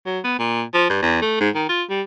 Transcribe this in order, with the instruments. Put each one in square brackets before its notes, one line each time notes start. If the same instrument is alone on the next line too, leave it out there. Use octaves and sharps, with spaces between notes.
[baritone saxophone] F#3
B3
A#2
F3
G2
E2
A3
G#2
D#3
F4
G3